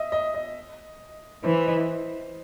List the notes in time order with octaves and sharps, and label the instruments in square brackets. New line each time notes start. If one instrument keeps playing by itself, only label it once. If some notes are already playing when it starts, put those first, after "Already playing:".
Already playing: [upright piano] D#5 E5
D#5
D#5
[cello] E3 [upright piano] C5
[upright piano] D#5